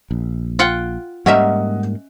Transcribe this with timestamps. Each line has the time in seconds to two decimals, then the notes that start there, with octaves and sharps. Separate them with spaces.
0.11 A#1
0.59 F4 F#5 G5
1.26 G#2 G3 A#3 C#4 A#4 D#5 E5 F#5